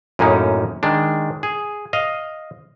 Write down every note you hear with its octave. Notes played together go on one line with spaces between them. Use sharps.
F#2 A2 A#3 C#4 D#4
D#3 G#3 D4
G#4
D#5 F5